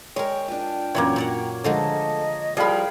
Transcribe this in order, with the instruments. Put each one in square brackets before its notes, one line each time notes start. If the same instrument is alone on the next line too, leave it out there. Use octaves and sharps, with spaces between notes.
[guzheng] G#3 A#4 [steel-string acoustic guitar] C#5 [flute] G5
[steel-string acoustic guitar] D4 F4
[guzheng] F#2 A#2 E3 [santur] A#3 C#5
[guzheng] A#2 D5 F#5
[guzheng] D3 F3 G#3 [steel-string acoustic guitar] A3 A4 [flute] D#5
[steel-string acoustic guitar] F3 G3 [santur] G#4 F5 B5 [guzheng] A#4 D#5 [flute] G5